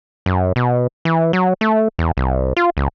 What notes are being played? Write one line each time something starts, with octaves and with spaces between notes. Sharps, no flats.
F#2
B2
E3
F#3
A3
E2
C2
F4
C#2